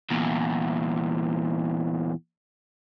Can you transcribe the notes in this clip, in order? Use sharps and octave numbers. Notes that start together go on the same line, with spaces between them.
E2 A#2